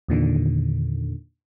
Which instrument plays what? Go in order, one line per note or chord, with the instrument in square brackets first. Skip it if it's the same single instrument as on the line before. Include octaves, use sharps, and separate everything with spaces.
[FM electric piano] E2 A#2 D3 D#3